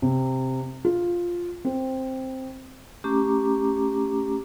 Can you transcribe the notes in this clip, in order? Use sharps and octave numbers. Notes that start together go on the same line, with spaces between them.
C3
F4
C4
A3 C#4 G4 A#5 D6